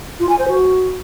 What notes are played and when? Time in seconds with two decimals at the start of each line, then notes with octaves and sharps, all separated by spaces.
0.20 F4
0.29 G#5
0.39 C5
0.48 F#4